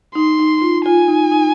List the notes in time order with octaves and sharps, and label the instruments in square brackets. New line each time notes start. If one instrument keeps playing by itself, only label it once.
[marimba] D#4 [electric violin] C6
[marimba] D#4
F4
[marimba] F4 [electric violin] G#5
[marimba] D#4
D#4